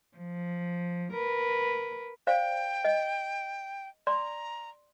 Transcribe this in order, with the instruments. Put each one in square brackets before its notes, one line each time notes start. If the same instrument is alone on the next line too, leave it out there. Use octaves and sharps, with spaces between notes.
[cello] F3
A#4 B4
[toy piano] C5 D5 F5 [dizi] G5
[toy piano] D#5
[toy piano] D5 C6 [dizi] A#5